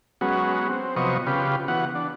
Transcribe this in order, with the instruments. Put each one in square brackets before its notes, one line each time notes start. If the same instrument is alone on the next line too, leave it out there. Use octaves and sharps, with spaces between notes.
[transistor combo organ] F#3 G#3 B3 C#4 F#4
C4
C3 F3 F#3 B3 D#5 C#6
C#3 F4 G4 B4
E3 B3 F#4 F#5
D4